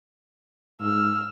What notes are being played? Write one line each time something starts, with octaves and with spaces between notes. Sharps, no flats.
G#2 E6 F6